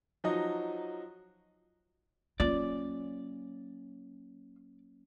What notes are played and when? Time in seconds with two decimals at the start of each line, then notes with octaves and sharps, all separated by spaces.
0.24 F3 F#3 D#4 F#4 D#5
2.40 F#3 A#3 C#4 F4 D5